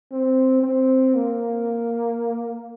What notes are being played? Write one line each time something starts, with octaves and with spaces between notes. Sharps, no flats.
C4
C4
A#3